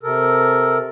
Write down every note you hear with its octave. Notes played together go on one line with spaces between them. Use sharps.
C3 A4 A#4